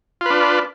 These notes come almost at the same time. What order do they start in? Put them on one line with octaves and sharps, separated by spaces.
F4 B4 D4